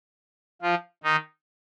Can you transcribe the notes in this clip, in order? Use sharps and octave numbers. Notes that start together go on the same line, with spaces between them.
F3 F4
D#3 D#4